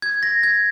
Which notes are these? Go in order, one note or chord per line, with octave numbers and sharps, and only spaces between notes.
G#6
A#6
G#6